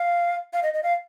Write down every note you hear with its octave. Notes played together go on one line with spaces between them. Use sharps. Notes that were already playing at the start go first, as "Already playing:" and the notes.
Already playing: F5
F5
D#5
D#5
F5